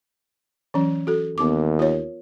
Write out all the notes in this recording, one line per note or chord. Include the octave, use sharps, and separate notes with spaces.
E3 F#3 C#4
F#4 A4
D#2 B3 D6
F4 A#4 C#5